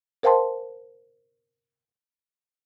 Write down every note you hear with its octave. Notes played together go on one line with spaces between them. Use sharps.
A#4 C5 F5 G5 A5 C6